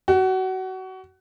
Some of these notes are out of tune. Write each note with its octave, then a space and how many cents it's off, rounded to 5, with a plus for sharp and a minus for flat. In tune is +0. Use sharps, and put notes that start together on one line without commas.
F#4 +25